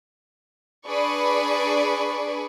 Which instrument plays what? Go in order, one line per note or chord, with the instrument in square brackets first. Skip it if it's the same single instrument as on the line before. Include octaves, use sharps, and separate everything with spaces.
[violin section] D4 G#4 B4 D5 B5 C#6